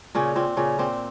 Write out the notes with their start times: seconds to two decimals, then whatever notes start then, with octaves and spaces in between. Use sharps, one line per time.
0.15 A#2 C#3 C#4
0.36 A#2 C4
0.57 A#2 C#3 C#4
0.79 A#2 C4